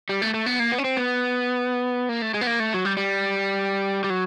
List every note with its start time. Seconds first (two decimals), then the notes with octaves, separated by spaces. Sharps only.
0.09 G3
0.22 A3
0.34 A3
0.46 B3
0.60 A#3
0.72 B3
0.78 C#4
0.84 C4
0.97 B3
2.09 A#3
2.22 A3
2.34 G#3
2.41 B3
2.47 A#3
2.60 A3
2.74 F#3
2.85 G3
2.97 G3
4.04 G3
4.10 F#3